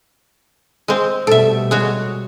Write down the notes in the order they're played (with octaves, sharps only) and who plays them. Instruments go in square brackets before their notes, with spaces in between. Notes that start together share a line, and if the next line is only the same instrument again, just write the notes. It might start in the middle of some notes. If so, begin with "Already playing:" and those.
[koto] G#3 C4
[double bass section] B2 G3 A3 [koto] A4 E5
[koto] G#3 F#4 C#5